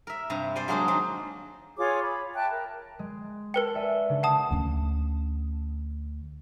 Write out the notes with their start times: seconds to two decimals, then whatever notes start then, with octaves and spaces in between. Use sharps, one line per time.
0.07 A#4 E5
0.30 G2 C3 A#5
0.55 C5 D5 G#5
0.68 F#3 G#3 A#3 D4 G#4 C5
0.88 D#3 F#3
1.78 F4 G#4 C#5 D6
2.02 B5
2.35 E5 G5 A5 F#6
2.49 A#4
2.99 G#3
3.54 A#4 B4 G5 A5
3.74 D5 E5 G#5
4.09 C#3 D4
4.23 F#5 G5 A5 D#6 A#6
4.51 D2 C#4